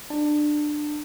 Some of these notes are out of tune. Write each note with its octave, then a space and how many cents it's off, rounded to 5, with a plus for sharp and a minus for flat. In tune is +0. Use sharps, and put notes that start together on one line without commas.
D4 +20 A5 +20